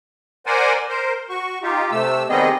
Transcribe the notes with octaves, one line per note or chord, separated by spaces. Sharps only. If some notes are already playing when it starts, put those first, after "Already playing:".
A#4 C5 D5 F#5 G#5
A#4 C5
F#4 C#6
D#4 F4 G4
C3 A3 E6
D#3 G3 B3 C4 G#4 D#5